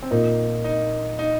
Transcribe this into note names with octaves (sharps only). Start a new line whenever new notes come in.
C4
A#2 A#3 D#4 F4
D#4
D#4